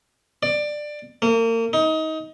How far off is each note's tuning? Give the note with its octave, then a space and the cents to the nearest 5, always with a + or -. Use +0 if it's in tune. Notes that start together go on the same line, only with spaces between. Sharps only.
D5 +15
A#3 -35
D#4 +25